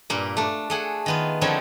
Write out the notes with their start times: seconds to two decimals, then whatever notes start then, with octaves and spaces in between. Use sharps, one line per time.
0.10 G2 A#2 A#3
0.37 A3 D4
0.70 A3 G#4 F#5
1.06 D#3 B3 F4
1.41 D3 F3 C4 D#4 E4 C#5